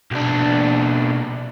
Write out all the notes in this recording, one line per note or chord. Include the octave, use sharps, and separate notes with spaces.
B1 D4